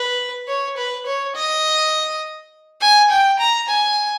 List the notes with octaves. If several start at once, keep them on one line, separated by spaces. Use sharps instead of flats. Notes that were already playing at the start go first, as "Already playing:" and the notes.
Already playing: B4
C#5
B4
C#5
D#5
G#5
G5
A#5
G#5